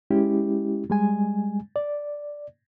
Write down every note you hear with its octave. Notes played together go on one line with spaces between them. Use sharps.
G#3 C#4 E4 G4
G3 G#3 G#5
D5